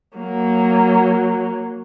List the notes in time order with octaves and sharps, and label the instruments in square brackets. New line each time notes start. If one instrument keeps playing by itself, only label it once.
[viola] F#3 A#3